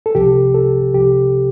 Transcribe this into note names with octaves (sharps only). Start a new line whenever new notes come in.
A4
C2 C3 F3 G4
A4
C2 C3 F3 G4